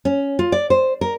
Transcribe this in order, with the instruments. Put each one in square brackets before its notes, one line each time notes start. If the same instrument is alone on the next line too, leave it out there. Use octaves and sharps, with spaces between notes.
[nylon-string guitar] C#4
F4
D5
C5
A#4